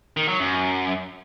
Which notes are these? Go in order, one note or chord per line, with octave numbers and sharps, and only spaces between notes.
D#3
F#3
F#2